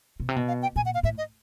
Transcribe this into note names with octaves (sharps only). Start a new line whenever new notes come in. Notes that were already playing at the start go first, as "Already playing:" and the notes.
B2
C3
B2
F5
G5
A#2 G#5
F#5
F5
A2 E5
D#5